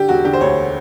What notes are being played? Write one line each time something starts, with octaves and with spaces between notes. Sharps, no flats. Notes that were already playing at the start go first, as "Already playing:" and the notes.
Already playing: D3 G4
E1 F#4
D3 G4
C5
D2 C#5